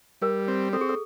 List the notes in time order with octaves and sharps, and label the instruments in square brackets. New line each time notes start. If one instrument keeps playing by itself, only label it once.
[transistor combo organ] G3 [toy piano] A#4
[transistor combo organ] C4
[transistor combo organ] C4 [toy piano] A4
[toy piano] G#4
A4